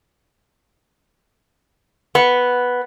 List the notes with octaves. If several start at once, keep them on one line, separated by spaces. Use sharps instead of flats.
B3